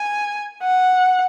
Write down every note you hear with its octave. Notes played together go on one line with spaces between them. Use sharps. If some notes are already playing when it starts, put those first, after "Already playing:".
Already playing: G#5
F#5